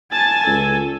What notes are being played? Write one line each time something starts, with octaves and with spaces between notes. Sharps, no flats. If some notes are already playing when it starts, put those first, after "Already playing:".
G#5 A5 A6
C#2 A4